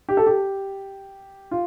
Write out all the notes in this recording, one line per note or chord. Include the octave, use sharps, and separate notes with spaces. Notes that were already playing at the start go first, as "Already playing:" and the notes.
G4
A4
G4
F4